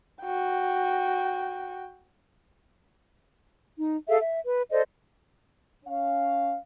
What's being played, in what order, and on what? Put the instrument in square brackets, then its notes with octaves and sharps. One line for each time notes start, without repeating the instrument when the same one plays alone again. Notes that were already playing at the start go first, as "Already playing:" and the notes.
[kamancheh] F#4 G5
[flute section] D#4
G#4 A4 E5 F5
E5
B4
A4 C5 D5 D#5
[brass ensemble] C#4 F5